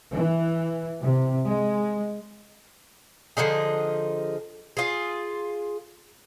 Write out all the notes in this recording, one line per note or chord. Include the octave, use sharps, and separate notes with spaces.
E3
C3
G#3
D3 F3 D#4 G#4
F4 G#4